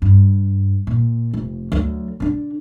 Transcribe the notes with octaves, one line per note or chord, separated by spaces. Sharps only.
G2
A#2
F1
D2 F#3
D3 D4